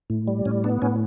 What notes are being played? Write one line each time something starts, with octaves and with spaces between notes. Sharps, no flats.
A2
G3
A2 C#4
B3 D4
A2 C#4